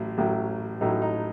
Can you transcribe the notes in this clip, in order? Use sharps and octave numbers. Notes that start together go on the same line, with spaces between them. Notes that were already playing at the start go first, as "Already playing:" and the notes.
Already playing: A1 A2 F#3
A1 A2 F#3
A1 A2 F#3 D#4
D#4